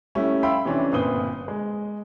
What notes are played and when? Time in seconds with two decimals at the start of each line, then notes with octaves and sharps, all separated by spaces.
0.15 G3 A3 C#4 E4
0.43 E5 F5 G5 B5 C6 E6
0.65 C3 E3 C#4 D4
0.92 G1 A#2 C4 B4 D#6 G7
1.48 G#3